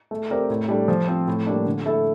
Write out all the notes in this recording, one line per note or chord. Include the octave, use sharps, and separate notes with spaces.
A3
C4 G4 A#4 D5
A2
G3 D4 A4
F3
C4 F4
A2
G3 A#3 D4
D3
A3 E4 A4